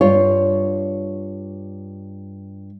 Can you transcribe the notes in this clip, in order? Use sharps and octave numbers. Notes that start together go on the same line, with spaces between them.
G2 F4 C#5